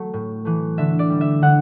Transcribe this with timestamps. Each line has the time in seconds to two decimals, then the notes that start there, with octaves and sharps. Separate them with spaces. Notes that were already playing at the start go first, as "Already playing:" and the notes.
Already playing: F#3 A3
0.13 A2
0.45 E3 A3
0.78 D3 E5
0.99 D5
1.10 G3
1.21 E5
1.42 D3 F#5